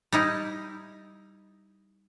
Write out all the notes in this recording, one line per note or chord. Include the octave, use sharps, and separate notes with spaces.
G3 D#4 E4